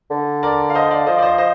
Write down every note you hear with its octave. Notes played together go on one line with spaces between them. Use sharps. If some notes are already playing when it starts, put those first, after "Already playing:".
D3
A#4 D5
F5
C5 D#5
D5 F5
F3 C5 D#5
D5
C5 D#5
C5 D#5